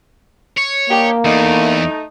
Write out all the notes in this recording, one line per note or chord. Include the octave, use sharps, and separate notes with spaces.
C#5
A#3 D4 D#4 G4
E2 A3 D#4